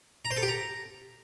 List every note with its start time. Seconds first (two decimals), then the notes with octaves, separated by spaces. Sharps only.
0.25 A#5
0.31 C5
0.36 A4
0.42 G4
0.48 A#5